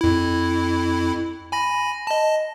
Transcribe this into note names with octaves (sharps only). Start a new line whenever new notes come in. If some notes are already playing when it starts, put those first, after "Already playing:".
F2 E4
G#5 B5 A#6
D#5 A5